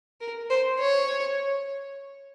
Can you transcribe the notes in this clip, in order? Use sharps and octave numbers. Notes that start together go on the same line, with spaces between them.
A#4
C5
C#5